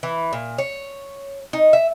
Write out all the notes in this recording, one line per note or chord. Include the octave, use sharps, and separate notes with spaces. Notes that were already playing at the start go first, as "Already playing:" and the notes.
E3
A#2
C#5
D#4
E5